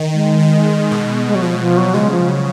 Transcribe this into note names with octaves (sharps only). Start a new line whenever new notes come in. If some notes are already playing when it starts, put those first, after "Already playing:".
Already playing: D#3
G#3
D#3
B2
G#3
F#3
B2 F3
F3
F#3
C#3 G#3
F3
F#3